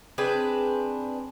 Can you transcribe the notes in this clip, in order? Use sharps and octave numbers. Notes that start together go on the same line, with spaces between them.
C4 D4 G#4 B4